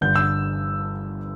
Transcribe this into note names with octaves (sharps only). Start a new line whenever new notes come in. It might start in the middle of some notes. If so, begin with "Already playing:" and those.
G1 G2 D3 G3 G6
E6